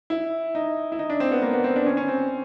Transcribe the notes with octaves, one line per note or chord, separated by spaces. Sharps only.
E4
D#4
E4
D#4
D4
C4
B3
A#3
B3
C4
D4
C#4
C#4
C4